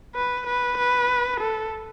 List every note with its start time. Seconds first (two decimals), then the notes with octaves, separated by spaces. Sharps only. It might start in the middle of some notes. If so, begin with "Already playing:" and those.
0.15 B4
0.46 B4
0.78 B4
1.40 A4